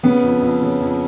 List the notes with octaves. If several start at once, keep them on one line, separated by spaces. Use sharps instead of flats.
C#3 B3
F2
F2
C#3
F2